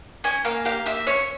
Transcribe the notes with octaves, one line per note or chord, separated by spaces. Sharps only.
C#4 G#5
A#3 F5
G4 F5
A#3 E5
C#4 C#5